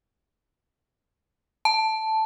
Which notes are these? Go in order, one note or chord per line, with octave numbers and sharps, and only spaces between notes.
A5